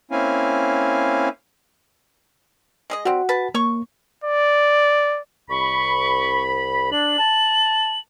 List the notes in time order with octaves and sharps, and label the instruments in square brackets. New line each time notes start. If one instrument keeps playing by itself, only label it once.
[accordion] A#3 C4 C#4 E4 F5 G#5
[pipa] G#3 G#4 D#5
[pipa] G3 C4 [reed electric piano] F#4 F#5
[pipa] B4 A5
[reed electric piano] A#3 [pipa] C#5 C#6
[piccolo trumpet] D5
[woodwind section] C2 B5 [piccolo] C#6
[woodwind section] D4 [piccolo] F#7
[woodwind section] A5